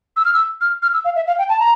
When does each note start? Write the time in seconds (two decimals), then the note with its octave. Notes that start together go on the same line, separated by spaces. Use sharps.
0.17 E6
0.25 F6
0.34 E6
0.61 F6
0.82 F6
0.93 E6
1.05 F5
1.16 E5
1.27 F5
1.38 G5
1.49 A5
1.60 A#5